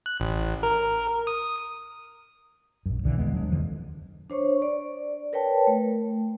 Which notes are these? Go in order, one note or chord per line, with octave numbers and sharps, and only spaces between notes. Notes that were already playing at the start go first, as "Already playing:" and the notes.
F#6
A1
A#4
D#6
A#1 F#2
D1 B1 D3 E3
E1 D2 G#3 B3
F#3 G#3 D4
F2 D3 E3 F3
D4 C5 C#5 C#6
D5
A#4 B4 C#5 G5 A5
A3